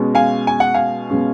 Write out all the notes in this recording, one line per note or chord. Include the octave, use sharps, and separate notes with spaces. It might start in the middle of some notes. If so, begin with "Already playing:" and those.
Already playing: B2 G#3 C#4
F5 G#5
G#5
F#5
F5 G#5
B2 G#3 C#4